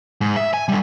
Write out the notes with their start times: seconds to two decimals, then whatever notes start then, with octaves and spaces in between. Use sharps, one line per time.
0.21 G#2
0.37 E5
0.54 G#5
0.68 D3 G3